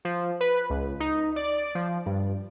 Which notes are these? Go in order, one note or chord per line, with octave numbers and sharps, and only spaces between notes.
F3
B4
C#2
D#4
D5
F3
G2